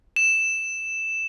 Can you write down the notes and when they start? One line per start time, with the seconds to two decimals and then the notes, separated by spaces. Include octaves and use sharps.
0.16 E7